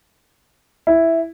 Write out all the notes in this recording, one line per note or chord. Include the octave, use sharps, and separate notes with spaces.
E4